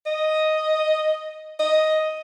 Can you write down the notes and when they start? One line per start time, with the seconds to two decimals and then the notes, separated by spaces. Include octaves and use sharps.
0.06 D#5
1.59 D#5